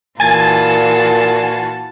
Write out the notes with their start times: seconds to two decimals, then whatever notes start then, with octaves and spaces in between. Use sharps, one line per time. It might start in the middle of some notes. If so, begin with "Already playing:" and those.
0.20 A#2 E3 F4 F#4 G#5 A5 A6